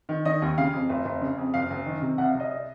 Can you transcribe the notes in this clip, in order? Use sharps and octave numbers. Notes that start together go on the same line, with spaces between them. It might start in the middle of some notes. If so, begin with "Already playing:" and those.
D#3
D#3 D#5
D#2
C#3 F5
F2
F1
F1
C#3
F2
F#1 F5
F#1
D#3
C3
C2 F#5
F5
C2
D#5
D#5